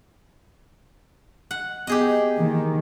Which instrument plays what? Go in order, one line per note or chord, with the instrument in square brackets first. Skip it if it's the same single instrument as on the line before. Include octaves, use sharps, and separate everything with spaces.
[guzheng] F#5
[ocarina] B3 [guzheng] G4 G#4 D#5
[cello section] D#3 [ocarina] A#3